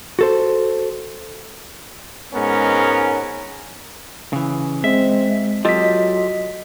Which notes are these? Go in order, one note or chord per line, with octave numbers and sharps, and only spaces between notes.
F#4 A4 C5
G#2 G#3 B3 C#4 A#4
C#3 E3
G#3 C4 E5
F#3 F4 G4 A4 D#5 B6